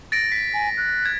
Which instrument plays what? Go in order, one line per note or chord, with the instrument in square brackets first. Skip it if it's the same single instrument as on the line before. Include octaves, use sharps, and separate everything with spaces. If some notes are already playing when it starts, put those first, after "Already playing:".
[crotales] A6 A#6 D7
B6
[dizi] G#5
F#6
[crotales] G#6